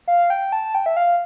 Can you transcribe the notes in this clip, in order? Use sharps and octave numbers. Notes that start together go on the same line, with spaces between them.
F5
G5
A5
G5
E5
F5